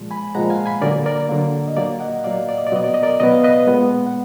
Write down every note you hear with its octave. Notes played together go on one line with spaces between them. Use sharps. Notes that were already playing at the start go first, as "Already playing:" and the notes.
Already playing: A#2 F3 G#3
G#5 B5
A#2 F3 G#3 F#5 A#5
F5 G#5
G#5 B5
D3 F#3 A#3 A#4 D5
A#4 D5
D3 F#3 A#3
D#5
A#2 F#3 A#3 D5 F5
D#5 F#5
A#2 F#3 A#3 D5 F5
D5
D#5
D5
B2 F#3 B3 D#5
D5
D#5
A#4 D5
B2 F#3 B3 D#5
F5
B4 D#5
A#2 G#3 B3
F#5